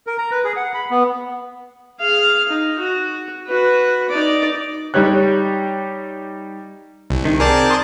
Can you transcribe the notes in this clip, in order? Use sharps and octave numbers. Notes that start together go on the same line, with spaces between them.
A#4
A#5
B4
G#4
F#5
B5
B3
G#4 F5
D#4
F#4
F#4 B4
D#4 D5
G3 D#4 G4 C#5 F#6
C2
D#3
C4 G#4 A#4 D5 A5
C6 D#6